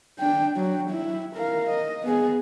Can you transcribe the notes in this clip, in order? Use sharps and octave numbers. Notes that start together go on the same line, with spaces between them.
D4 G5
F#3
E4
A#4 F5
D#5
B3 G#4